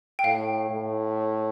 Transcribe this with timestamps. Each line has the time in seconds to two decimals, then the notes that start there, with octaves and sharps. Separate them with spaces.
0.19 G5
0.24 A2 F5
0.70 A2